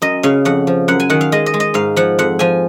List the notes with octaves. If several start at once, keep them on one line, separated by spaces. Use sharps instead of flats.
F#2 D#5
C#3 F5
F2 F#5
F3
F#2 F#5
G#5
D#3 F#5
F5
G#3 D#5
D#5
G#3
D#5
G#2 F5
F3 F#5
F2 F#5
F3 G#5